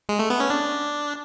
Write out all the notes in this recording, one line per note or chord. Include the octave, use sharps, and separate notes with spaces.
G#3
A3
B3
C#4
D4